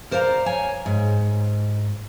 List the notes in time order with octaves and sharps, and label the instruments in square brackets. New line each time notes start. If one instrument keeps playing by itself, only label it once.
[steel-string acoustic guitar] A#4 C5 D5 F5 F#5 A#5
C#5 G#5
G#2